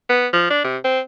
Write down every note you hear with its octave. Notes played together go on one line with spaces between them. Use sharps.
B3
F3
D4
C3
C4